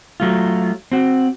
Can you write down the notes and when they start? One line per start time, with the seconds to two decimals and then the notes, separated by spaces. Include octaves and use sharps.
0.20 F#3 A3 F4
0.92 C4 F#4